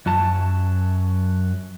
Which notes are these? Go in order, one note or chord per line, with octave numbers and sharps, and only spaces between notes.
F#2 F#3 A5